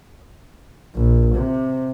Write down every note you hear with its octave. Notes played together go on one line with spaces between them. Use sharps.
A#1
C3